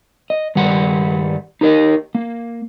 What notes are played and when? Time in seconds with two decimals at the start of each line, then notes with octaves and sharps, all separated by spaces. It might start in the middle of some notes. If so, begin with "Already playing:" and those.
0.30 D#5
0.55 G2 D#3 G3 F#5
1.61 D#4 G4 A#4 C#5 D#5
2.15 A#3